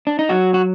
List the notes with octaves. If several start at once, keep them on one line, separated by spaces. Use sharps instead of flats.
D4
D#4
F#3 F#4
F#4